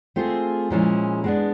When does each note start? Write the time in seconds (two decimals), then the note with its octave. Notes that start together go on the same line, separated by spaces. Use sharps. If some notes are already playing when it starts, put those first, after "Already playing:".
0.16 A3 C4 F4 G#4
0.70 A#2 F3 G#3 C#4 E4
1.24 G#3 B3 D4